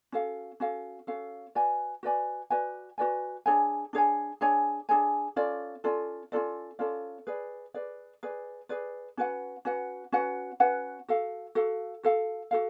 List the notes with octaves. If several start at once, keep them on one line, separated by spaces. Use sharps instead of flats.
C#4 F#4 A4 F5
C#4 F#4 A4 F5
C#4 F#4 A4 F5
F#4 B4 D5 G#5
F#4 B4 D5 G#5
F#4 B4 D5 G#5
F#4 B4 D5 G#5
D4 G#4 C#5 G#5
D4 G#4 C#5 G#5
D4 G#4 C#5 G#5
D4 G#4 C#5 G#5
C#4 F4 A4 D5
C#4 F4 A4 D5
C#4 F4 A4 D5
C#4 F4 A4 D5
G#4 B4 D5
G#4 B4 D5
G#4 B4 D5
G#4 B4 D5
C#4 F#4 B4 F#5
C#4 F#4 B4 F#5
C#4 F#4 B4 F#5
C#4 F#4 B4 F#5
F#4 A4 F5
F#4 A4 F5
F#4 A4 F5
F#4 A4 F5